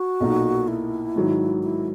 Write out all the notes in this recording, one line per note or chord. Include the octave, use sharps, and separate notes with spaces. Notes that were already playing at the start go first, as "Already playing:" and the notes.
Already playing: F#4
B1 A#2 A#3 D#4
E4
G#2 D#3 F#3
E4